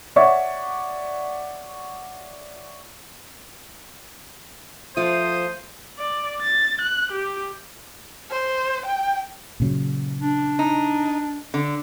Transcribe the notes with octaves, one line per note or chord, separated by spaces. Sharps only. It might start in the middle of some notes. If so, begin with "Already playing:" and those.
C#5 D5 E5 F#5 C#6
F3 A3 F4 C5 D#6
D5
A6
F#6
G4
C5
G5
A#2 C#3 F#3
D4
D#4
D3